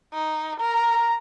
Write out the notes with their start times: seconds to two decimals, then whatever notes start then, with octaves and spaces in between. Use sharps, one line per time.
0.13 D#4
0.60 A#4 A#5